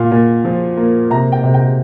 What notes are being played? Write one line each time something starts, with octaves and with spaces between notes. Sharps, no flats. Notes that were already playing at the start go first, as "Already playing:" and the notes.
Already playing: A#2 F5
A#2
F3
A#3
C3 A#5
G5
C3
G5